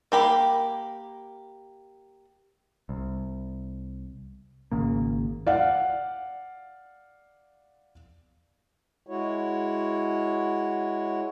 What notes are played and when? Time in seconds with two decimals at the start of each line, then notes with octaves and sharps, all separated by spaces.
0.12 A#3 G4 B5
2.89 C2
4.72 G#1 C#3 A#3
5.47 D5 F5 F#5
9.07 G#3 E4 F#4 C#5